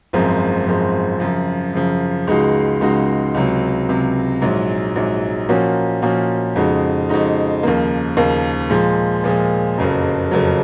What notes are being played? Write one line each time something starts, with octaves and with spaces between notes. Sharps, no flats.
G#1 F#2 F3 G#3 C4
G#1 F#2 F3 G#3 C4
F#2 C#3 F3
F#2 C#3 F3
C#2 C#3 G#3 D#4 F#4
C#2 C#3 G#3 D#4 F#4
C#2 C3 F#3
C#2 C3 F#3
A#1 G#2 F#3
A#1 G#2 F#3
A#2 F3 A#3 C#4 F#4
A#2 F3 A#3 C#4 F#4
F2 C#3 G#3 D#4 F#4
F2 C#3 G#3 D#4 F#4
D#2 C#3 F3 A#3
D#2 C#3 F3 A#3
A#2 F3 G#3
A#2 F3 G#3
F#1 F2 C#3 F#3
F#1 F2 C#3 F#3